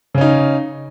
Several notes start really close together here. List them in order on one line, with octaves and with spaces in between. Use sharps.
C#3 C#4 D#4